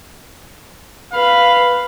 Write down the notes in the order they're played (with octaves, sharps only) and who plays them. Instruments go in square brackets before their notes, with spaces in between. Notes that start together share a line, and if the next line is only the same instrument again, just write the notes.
[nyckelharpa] B4 B5 [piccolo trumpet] F5